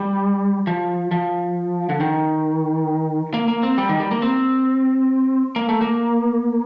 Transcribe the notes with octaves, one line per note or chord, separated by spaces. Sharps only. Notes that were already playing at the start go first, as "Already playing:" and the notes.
Already playing: G3
F3
F3
D3
D#3
A#3
A#3
C4
G3
D#3
G3
A#3
C4
A#3
A3
A#3